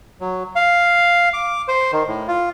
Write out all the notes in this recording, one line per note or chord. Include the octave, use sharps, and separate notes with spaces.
F#3
F5
D6
C5
D#3
A2
F4